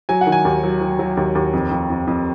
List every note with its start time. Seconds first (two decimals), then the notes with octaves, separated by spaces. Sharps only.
0.09 F#3 G#5
0.21 F#5
0.27 D#3
0.32 G#5
0.45 D#2
0.64 F#3
0.81 F#3
0.99 F#3
1.17 D#2
1.35 D#2
1.53 F2
1.71 F2
1.90 F2
2.07 F2